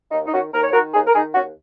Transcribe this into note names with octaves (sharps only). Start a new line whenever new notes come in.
D#2 D#4
D#4
D#3 C#4 F#4
D#2 A#4
C#5
D#3 F#4 A#4
D#2 D#4 G#4
A#4
D#3 D#4 G#4
D#2 C#4 F#4